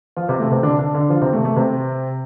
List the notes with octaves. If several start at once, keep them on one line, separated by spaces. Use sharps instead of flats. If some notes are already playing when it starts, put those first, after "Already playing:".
F3 F4
C3 C4
A3
C3 C4
D3 D4
D3 D4
D3 D4
F3 F4
C3 C4
A3
A3
C3 C4